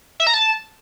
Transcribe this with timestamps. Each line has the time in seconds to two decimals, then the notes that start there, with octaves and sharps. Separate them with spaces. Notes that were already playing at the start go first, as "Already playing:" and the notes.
0.20 E5
0.27 A#5
0.34 A5